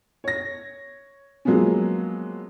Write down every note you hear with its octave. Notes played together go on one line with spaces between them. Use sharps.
C#5 A#6
F3 F#3 G#3 A#3 B3 C#4